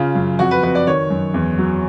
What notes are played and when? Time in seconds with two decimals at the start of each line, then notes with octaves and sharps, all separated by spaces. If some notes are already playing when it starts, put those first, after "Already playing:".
Already playing: C#3 F4
0.15 F#2
0.39 F2 F#4
0.51 B4
0.63 F2 B4
0.75 D5
0.87 D#3 C#5
1.10 F#2
1.34 E2
1.58 F#3